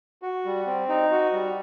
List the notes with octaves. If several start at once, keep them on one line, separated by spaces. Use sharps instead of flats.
F#4
G3
C4
D#4
F#4
G3